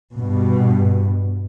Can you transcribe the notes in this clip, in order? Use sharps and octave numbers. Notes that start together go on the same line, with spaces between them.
G2 B2